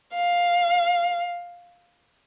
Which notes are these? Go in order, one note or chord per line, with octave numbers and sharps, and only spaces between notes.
F5